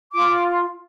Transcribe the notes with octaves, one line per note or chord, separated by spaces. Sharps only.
F4 D6